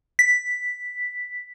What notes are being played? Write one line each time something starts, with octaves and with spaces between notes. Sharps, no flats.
B6